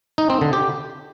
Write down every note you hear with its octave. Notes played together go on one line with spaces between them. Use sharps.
D#4
C4
D3
G4